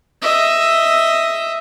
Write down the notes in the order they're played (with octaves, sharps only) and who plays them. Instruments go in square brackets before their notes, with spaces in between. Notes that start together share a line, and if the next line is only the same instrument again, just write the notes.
[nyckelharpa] D#5 E5